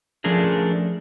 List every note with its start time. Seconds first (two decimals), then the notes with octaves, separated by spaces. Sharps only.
0.24 F3 A3 C#4 D4 G#4 A#4